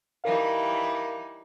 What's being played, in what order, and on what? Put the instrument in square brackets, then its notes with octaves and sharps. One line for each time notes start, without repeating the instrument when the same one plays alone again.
[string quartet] E3 G3 D#4 [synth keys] A#4 F5